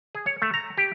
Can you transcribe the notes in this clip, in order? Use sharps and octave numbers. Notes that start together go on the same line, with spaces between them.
G#4
C#5
A3
A#5
G4